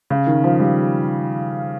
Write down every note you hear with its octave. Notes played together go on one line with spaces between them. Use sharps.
C#3
D#3
F3
G3